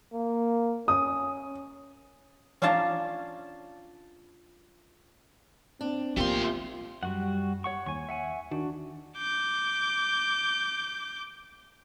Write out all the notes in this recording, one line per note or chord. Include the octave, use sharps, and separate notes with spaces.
A#3
C#4 D#6
C#4 D4 F4 F5 A5 A#5
C4 D4
A#2 F3 A3 B3 D#4 G4 C6
F#2 G3 F#4 F#5
C#5 F#5 C#6
D#2 G#5 C#6
E5 F#5 G#5
D#3 D4 F#4
D6 G6